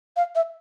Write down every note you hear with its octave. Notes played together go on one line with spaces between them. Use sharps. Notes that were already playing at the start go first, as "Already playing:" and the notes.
F5
E5